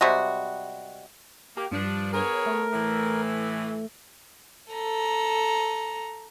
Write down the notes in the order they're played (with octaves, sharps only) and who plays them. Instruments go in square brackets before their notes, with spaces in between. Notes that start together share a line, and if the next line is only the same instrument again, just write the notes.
[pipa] C3 G3 G#3 F#4
[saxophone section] A#3 [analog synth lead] G4
[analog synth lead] G2 [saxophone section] F3 D4
[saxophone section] B3 G#4 C#5 [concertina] A#4
[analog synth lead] A3
[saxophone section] A2 E3
[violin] A4 A#5